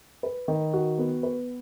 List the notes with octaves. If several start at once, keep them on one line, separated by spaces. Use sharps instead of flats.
B4
D#3
F#4
B3
B4